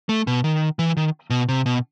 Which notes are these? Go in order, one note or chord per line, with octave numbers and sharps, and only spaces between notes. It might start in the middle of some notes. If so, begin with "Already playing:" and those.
A3
B2
D#3
E3
D#3
B2
C3
B2